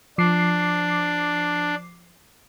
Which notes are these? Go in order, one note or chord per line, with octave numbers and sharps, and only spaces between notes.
F3 D4 D6 C7